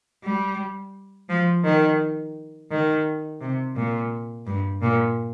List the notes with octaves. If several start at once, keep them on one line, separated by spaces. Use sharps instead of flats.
G3
F3
D#3
D#3
C3
A#2
G2
A#2